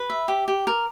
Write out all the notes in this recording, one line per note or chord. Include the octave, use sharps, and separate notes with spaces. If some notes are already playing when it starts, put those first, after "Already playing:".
Already playing: B4
E5
G4
G4
A#4